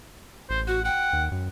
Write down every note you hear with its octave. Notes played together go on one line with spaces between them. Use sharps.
A1 C5
F#4 F#5
F#5 G5
D#2
F#2